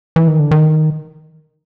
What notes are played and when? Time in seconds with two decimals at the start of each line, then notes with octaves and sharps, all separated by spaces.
0.16 E3
0.28 D#3
0.39 D3
0.51 D#3